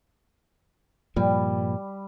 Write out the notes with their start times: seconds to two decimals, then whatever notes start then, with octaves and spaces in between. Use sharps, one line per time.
1.16 G2 A#2 F3 G3